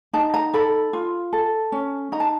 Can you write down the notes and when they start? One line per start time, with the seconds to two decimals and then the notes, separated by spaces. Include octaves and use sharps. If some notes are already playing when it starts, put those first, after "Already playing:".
0.13 D#4 A5
0.34 A#5
0.54 A4 B5
0.93 F4
1.33 A4
1.72 C#4
2.12 D#4 A#5
2.20 A5